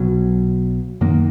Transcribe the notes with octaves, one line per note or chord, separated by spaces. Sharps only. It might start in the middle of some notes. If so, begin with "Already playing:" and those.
Already playing: B1 B2 F#3
F#2 D#3 A#3